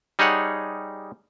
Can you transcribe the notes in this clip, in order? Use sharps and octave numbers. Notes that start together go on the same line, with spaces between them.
G3 D#4 G#4 C#5 F#5